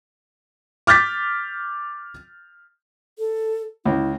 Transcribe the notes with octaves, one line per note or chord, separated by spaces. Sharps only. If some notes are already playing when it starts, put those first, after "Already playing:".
D6 F6 G6 A6 B6
A4
C#2 E4